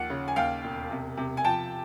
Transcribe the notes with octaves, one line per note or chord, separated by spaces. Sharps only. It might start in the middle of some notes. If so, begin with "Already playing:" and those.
Already playing: D#2 F3 F#5
C#3
G#5
D#2 F5 G5
E1
C3
C3
G#5
F3 G5 A5